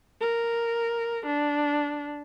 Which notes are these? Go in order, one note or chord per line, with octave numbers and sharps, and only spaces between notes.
A#4
D4